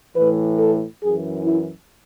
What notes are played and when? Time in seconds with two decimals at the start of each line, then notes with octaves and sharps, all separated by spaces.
0.14 A2 E3 B4
0.58 A4
1.00 F#2 E3 G#4
1.44 E4